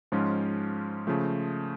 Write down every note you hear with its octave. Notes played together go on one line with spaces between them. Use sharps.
G#2 F3 G#3 C#4 F4
C#3 F3 A3